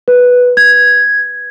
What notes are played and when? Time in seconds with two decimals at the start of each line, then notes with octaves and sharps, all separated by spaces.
0.08 B4
0.57 G#6